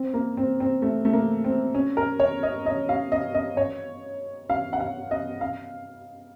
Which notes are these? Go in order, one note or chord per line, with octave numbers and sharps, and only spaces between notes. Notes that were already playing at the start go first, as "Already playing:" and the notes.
Already playing: C4
A#3
C4
C4
A3
A3
A#3
C4
C#4
A#4
C#5
D#5
D#5
F5
D#5
D#5
C#5
F5
F#5
F5
D#5
F5